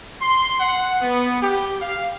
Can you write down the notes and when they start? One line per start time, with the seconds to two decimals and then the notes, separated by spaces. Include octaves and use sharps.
0.22 C6
0.60 F#5
1.02 B3
1.41 G4
1.81 F5